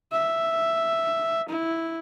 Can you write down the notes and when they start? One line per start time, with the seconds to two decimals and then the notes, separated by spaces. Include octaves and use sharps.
0.12 E5
1.49 E4